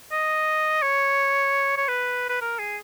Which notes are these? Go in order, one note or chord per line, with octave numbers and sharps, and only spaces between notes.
D#5
C#5
C#5
B4
B4
A#4
G#4